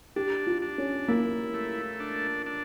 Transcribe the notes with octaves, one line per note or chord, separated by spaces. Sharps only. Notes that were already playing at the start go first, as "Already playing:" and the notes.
D4 G4
F4
D4
C#4
A#3 E4
A3
D4
D4